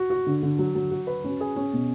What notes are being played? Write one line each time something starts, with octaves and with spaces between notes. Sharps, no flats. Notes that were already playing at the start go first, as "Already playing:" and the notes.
Already playing: F#4
F#4
D3
D3
F#3
F#3
F#4
B4
C#4
G#4
C#4
B2